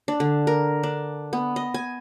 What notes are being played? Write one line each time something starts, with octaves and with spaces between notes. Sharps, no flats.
D4
D3
A#4
D4
B3
D#5
G#5